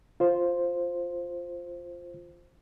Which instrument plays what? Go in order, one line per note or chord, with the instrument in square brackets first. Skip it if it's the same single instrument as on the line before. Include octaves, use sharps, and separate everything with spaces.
[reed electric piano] F4 C5